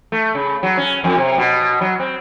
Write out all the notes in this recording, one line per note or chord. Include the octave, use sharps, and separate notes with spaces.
A3
C#3
F#3
C#4
F2
C3
B2
F#3
C4